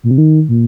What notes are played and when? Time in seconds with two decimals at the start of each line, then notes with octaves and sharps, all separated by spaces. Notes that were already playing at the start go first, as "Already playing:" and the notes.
0.04 A#2
0.11 C3
0.18 D#3
0.49 A#2